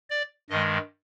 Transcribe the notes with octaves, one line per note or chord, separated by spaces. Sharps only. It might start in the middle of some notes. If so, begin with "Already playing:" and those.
D5
G2 D#3 G#3 D#5